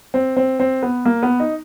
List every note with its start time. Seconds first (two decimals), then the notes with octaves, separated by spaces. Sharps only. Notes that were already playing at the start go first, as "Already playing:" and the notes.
0.14 C4
0.37 C4
0.60 C4
0.82 B3
1.05 A#3
1.23 B3
1.40 D#4